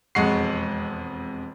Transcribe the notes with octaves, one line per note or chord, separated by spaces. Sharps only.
E1 F2 G#3 F#5 C#6 C7